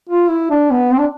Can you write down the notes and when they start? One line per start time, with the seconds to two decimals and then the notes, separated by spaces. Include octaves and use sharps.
0.09 F4
0.29 E4
0.50 D4
0.71 B3
0.92 C4
0.98 D4